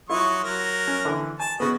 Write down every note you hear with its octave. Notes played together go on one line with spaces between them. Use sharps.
F#3 E4 F4 C#6 D#6
F#3 A#4
C#4
D3 E3
G#5 A5
C#3 B3 F#4 D#5